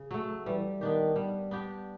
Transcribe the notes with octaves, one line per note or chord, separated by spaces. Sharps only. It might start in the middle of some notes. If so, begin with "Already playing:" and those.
Already playing: C#3
F#3 A3
E3 G3
D#3 B3 D4 G4
G3
B3 D4 G4